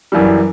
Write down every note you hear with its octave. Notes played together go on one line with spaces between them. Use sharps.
F#2 E3 G3